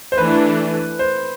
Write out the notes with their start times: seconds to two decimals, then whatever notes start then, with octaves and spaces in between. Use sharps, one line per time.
0.12 C5
0.18 E3 A3 D4 B4
0.99 C5